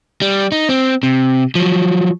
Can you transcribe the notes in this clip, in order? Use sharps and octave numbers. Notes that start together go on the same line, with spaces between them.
G3
D#4
C4
C3
F3 F#3